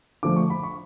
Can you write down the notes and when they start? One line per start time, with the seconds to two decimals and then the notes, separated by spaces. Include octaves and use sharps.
0.23 D3 F3 A3 D6
0.36 C#6
0.50 B5
0.63 C#6